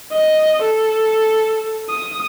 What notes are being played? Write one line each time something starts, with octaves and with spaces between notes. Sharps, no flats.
D#5
A4
D#6